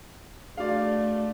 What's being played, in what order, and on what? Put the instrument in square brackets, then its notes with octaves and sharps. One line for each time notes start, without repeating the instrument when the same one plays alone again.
[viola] A3 [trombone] D4 [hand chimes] F#4 G#4 [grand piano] D5 F5